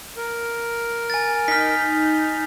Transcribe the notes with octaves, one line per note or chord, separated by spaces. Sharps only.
A#4
G#5 A6
D#4 F6 B6